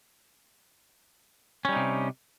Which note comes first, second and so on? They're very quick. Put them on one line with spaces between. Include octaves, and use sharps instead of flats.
C#4 G3 D#4 C3